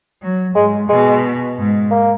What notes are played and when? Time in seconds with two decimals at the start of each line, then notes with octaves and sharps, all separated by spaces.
0.22 F#3
0.55 G#2 G#3
0.89 B2 G#3
1.58 G#2
1.91 A#3